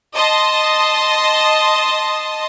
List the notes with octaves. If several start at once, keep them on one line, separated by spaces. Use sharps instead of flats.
D#5 A5 C6